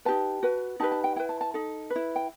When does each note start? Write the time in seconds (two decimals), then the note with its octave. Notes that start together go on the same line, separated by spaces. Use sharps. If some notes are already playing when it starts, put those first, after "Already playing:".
0.05 D#4 G4 B4 A5
0.43 F#4 B4
0.80 D#4 G4 B4 A5
0.92 A5
1.04 G5
1.16 E4 B4 G5
1.29 A5
1.41 A5
1.54 D#4 A4
1.90 B4
1.96 E4
2.16 G5